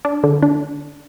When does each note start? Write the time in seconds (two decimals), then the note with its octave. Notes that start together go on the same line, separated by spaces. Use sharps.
0.05 D4
0.24 D3
0.43 D4